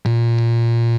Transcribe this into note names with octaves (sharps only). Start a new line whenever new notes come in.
A#2